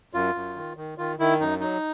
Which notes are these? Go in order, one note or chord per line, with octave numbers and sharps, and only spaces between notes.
F#2 F4
F#2
D#3
D#3
D#3 F4
D#3 E4
F#2 D#4
F#3 D#4